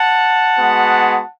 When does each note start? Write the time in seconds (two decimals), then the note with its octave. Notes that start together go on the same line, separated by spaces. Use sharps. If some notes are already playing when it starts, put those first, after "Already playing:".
Already playing: F#5 A5
0.57 G#3 B3 F#4